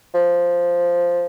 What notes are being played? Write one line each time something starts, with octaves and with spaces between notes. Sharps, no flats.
F3